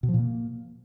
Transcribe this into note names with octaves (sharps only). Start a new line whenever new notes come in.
B2
F3
A#2
A#3